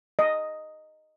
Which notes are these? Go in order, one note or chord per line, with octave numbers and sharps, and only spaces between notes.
D#5